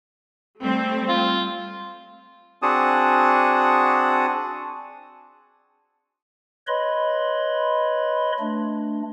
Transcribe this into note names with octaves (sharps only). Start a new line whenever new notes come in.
G3 A3 C4
F4
C4 D4 F#4 G#4 A5 D#6
B4 C#5 D#5 B5 C6
A3 D4